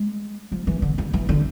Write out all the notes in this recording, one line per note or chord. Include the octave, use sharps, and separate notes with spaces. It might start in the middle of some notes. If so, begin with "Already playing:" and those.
Already playing: G#3
F3
E3
D3
D3
E3
D3